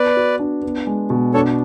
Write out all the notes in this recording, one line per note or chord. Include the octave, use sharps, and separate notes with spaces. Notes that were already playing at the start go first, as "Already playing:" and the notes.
Already playing: B3 B4 D5
F#4
D4
B3
G#3
B2
D4 A4 C#5